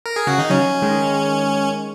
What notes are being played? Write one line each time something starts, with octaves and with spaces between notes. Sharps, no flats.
A#4
G#4
C#3 F#4
D#3 D#4
C#3 F#3 C#4
D#3 G#3